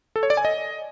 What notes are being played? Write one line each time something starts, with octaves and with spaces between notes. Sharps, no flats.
A4
C#5
D5
G#5
D#5